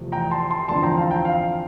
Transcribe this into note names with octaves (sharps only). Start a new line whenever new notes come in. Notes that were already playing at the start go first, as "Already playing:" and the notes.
Already playing: E2 C3 F3 A3
G5 A#5
A5 C6
A5 C6
E2 D3 F3 C4 A5 C6
G5 A#5
F5 A5
G5 A#5
F5